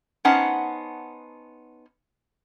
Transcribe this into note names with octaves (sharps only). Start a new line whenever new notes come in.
B3 C#4 D#4 C5 F#5 A5